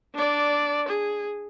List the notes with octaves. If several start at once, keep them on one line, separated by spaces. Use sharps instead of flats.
D4 D5
G#4